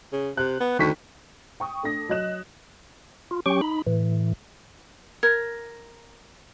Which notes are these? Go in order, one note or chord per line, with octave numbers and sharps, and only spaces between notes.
C#3
C3 F#6
B3
D2 D#3 C#6 B6
G5 C#6 D#6
A3 D4 A#6
F#3 D#5 F#6 E7
F4
F#3 C#4 G4 G5 C#6
D#4 B5
A2 E3
A#4 G#6